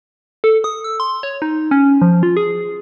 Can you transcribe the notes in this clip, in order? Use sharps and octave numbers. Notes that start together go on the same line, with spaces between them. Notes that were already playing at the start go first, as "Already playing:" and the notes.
A4
D#6
E6
C6
C#5
D#4
C#4
F3
F4
G#4